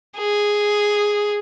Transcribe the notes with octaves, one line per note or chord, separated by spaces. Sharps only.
G#4